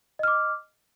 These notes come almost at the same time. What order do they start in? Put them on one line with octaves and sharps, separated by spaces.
D#5 F6 D6